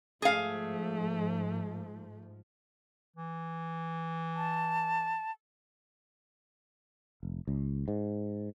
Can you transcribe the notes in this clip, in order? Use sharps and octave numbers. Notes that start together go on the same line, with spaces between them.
G#2 F3 A3 G#4 F5
E3
A5
F1
C#2
G#2